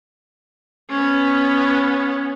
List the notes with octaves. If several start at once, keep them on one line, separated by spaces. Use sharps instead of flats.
B3 C#4